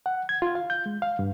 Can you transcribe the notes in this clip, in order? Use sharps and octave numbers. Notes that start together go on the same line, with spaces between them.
F#5
G#6
F4
F5
G6
G#3
F5
G2